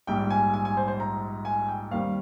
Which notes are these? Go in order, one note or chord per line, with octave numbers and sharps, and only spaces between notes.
A#1 G#2 G3 G5
G#5
G#5
G#5
C5
C5
A#5
G#5
G5
D#2 D#3 G3 C4 F5